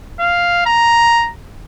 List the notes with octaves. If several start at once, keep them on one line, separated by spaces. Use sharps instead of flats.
F5
A#5